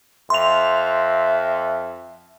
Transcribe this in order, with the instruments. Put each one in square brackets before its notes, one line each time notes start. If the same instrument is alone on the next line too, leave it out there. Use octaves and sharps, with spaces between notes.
[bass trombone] F2 [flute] E5 [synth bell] C6 F7